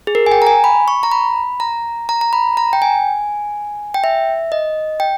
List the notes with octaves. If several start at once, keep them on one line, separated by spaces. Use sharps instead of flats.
G#4
A#4
G#5
G5
A#5
G#5
B5
C#6
A#5
B5
A#5
A#5
A#5
B5
A#5
G5
G#5
G5
E5
D#5
G5